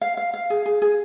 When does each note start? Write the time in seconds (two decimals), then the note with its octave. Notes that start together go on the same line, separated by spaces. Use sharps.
0.01 F5
0.17 F5
0.34 F5
0.50 G#4
0.66 G#4
0.82 G#4